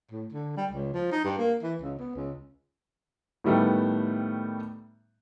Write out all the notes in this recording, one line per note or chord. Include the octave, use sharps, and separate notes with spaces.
A2
D3
G3
C#2
F3
D#4
G2
A#3
E3
C#2
B3
C#2
A2 D#3 G3 A3 B3